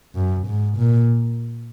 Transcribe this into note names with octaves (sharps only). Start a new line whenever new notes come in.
F#2
G#2
A#2